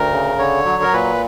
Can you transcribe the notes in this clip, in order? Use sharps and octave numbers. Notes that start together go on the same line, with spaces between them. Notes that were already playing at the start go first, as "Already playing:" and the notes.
Already playing: D2 A#4
C#3
D3 C#5
F#3
A#4
A#2 B4